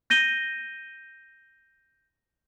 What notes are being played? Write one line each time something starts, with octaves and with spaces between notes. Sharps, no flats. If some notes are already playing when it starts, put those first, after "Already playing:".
G6 A#6 D#7 G7